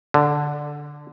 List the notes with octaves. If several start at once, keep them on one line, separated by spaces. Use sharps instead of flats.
D3